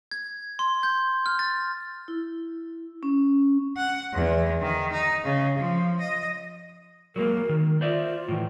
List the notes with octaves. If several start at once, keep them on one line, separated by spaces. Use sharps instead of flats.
G#6
C6
G6
F6
A6
E4
C#4
F#5
E2
D#3
D#4
C#3
F3
D#5
F#3 G#3 A#3 A#4
D#3
F4 C5 D5 E5
A2 E3